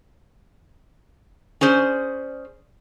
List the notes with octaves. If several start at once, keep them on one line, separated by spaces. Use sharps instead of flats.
C#4 G#4 C5 D5